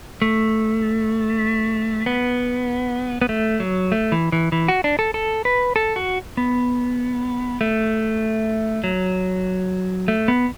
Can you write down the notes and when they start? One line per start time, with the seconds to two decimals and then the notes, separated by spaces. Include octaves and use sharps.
0.22 A3
2.06 B3
3.22 B3
3.29 A3
3.60 F#3
3.92 A3
4.12 E3
4.32 E3
4.52 E3
4.68 F#4
4.84 D4
4.99 A4
5.14 A4
5.45 B4
5.76 A4
5.96 F#4
6.37 B3
7.61 A3
8.84 F#3
10.08 A3
10.28 B3